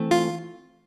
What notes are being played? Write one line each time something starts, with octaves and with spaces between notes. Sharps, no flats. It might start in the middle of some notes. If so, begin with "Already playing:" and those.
Already playing: E3 A3 C4
F4